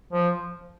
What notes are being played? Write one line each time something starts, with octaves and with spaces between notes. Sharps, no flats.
F3